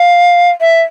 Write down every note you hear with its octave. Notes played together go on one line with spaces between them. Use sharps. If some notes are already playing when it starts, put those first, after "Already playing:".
Already playing: F5
E5